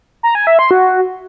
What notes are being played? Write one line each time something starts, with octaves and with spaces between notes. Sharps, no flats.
A#5
G#5
E5
C6
F#4